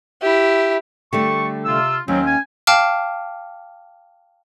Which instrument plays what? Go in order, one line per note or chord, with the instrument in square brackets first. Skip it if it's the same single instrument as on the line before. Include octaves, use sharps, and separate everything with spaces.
[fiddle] E4 G4
[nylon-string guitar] D3 G3 A3 [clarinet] C#6
[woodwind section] C3 F4 [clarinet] E6
[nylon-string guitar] D#2 [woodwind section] F#3 C4 [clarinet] C#4
[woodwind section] G#5
[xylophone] F5 G5 A5 D6 F6